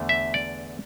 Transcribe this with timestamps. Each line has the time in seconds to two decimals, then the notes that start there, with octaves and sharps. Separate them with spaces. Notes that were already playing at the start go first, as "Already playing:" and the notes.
Already playing: E2 D3 A3
0.09 E5
0.34 D5